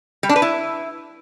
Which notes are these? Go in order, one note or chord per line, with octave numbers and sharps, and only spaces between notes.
G3
D4
B4
E4